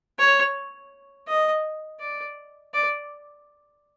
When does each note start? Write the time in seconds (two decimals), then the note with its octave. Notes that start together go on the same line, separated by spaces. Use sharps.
0.19 C#5
1.28 D#5
2.00 D5
2.74 D5